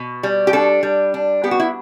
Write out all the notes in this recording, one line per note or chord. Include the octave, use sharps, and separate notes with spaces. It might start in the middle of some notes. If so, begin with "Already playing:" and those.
Already playing: B2
G3
G4
D4 A4
G3
D4
B3 G4
F#4
E4